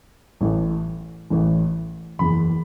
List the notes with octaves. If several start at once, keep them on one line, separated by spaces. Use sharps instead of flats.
A1 A2 E3
A1 A2 E3
F#1 E2 E3 B5